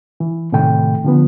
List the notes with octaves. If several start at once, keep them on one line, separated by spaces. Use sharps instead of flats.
E3
A2 C3 D#3 A3 G5
D3 F3 B3